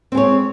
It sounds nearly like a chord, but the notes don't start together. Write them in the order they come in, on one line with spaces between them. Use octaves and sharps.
C4 G#3 C#5